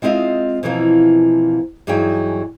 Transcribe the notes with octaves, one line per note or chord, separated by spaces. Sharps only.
G#3 C4 E4 F4 D#5 E5
B2 E3 F3 A#3 C4
G2 E3 F#3 D#4 G#4 G5